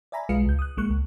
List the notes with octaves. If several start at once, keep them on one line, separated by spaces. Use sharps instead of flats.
D5 E5 G#5 A#5 B5
B1 G#3 F4 B4 F5 C#7
C#2 G6
D#6 F#6
A#1 G#3 A#3 C#6 F#6
C#2